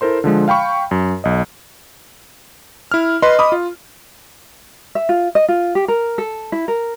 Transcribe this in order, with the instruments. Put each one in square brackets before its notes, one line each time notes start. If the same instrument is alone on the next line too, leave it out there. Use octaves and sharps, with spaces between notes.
[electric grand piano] E4 A4 A#4 C5 C6
D3 F3 G#3
F5 G5 B5 C#6
F#2
B1 D#5
E4 F6
[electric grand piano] B4 C6 [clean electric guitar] D#5
[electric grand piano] B5 D6 D#6
F4
[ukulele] E5
F4
D#5
F4
G4
A#4
A4
E4
A#4